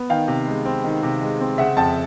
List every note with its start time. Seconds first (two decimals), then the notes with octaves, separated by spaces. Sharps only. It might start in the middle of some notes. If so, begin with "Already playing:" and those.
Already playing: B3
0.10 D#3 F5 G5
0.28 C3
0.47 G#3
0.65 C4
0.84 D#3
1.03 C3
1.21 G#3
1.40 C4
1.58 C#3 E5 F#5
1.76 F2 G5 A5